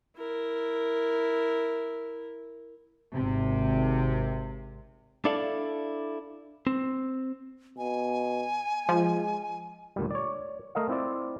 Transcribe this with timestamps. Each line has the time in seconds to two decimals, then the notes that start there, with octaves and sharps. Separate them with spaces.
0.17 E4 A#4
3.14 G#1 C3
5.25 D4 E4 A4 D5 F5
6.67 C4
7.78 B2 G#5
8.89 F3 G#3
9.96 D2 A#2 G3
10.11 C#5 D5
10.75 A3 A#4 D#5 F5
10.89 C4 E4 F4 D5